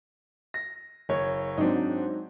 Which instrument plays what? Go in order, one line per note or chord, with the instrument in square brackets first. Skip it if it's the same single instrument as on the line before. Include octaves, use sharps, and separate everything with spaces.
[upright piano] A#6
F#1 C#5
[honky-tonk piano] G#2 F#3 C4 [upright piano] D4 D#4